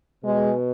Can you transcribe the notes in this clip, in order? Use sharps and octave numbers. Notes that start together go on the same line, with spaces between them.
B2 G#3